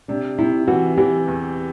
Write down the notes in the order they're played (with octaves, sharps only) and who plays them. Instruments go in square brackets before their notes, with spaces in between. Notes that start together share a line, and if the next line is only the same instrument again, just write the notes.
[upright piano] C3 [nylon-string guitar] D4
[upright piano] C3 [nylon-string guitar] E4
[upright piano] E3 [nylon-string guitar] F#4
[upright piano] E3 [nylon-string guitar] G4
[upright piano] E2